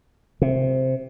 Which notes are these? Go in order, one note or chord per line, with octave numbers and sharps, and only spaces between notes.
C3